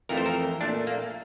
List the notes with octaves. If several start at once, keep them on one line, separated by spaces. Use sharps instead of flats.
F2 E3 A3 A#4
C5
A#4
A#2 A3 D4
A#3